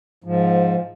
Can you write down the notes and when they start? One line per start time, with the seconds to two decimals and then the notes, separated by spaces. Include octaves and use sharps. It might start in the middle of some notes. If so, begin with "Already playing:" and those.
0.24 G#2 F3